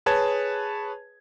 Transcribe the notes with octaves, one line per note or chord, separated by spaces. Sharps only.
G#4 B4 C#5 A5 G#6